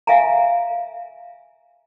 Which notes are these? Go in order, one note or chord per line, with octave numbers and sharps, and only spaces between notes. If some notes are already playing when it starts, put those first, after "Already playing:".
E5 F5 G#5 A#5